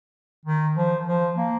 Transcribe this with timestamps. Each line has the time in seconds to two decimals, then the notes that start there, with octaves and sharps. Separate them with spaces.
0.45 D#3
0.77 F3
1.07 F3
1.37 A#3